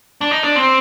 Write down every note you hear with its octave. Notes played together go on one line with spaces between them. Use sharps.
D4
D#4
D4
C4